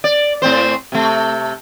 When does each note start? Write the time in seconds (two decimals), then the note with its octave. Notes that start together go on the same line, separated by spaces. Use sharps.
0.04 D5
0.42 A2 C4 C5
0.92 C3 A3